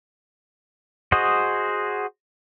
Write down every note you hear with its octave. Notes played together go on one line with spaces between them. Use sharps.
F#4 G#4 C5 D#5